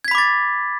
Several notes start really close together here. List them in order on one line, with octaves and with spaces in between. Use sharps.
G#6 B6 B5 D6 A6